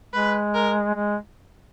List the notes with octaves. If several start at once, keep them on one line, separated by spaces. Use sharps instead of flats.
G#3 B4
A#4
G#3